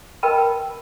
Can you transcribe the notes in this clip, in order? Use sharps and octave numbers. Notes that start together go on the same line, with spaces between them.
A#4 B4 D#5 G5 A5 B5